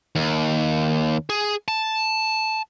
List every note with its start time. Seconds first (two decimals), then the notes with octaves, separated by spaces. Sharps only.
0.15 D#2
1.30 G#4
1.68 A5